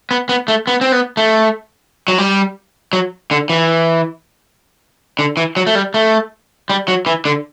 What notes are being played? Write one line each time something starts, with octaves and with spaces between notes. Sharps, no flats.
B3
B3
A3
B3
C4
B3
A3
F#3
G3
F#3
D3
E3
D3
E3
F#3
A3
G3
A3
G3
F#3
E3
D3